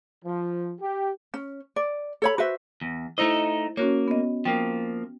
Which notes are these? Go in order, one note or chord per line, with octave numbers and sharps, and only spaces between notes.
F3
G4
C#4
D5
A4 C#5 B5
F#4 B4 C5 E5
E2
A3 D#4 E4 C5 D#5
A#3 C#4 F#4 C#5
B3 D#5
F3 A#3 G5